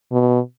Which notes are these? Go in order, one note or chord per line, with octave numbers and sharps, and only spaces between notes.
B2